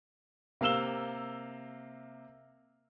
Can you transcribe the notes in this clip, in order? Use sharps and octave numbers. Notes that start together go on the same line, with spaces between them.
C3 A#3 F5 E6 E7 G7